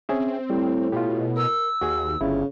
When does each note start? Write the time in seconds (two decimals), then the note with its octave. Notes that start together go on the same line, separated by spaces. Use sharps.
0.09 C4 C#4 G#4 E5
0.50 A2 G3
0.92 B2 F4 G4
1.37 A#4 E6
1.81 D#2 F#4 G#4
2.21 G1 C#3 E4 F4